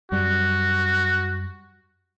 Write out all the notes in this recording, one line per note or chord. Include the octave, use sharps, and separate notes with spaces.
F#2 G3 F#4